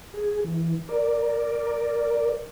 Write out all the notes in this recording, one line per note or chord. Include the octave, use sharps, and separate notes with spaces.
G#4
E3
A#4 D5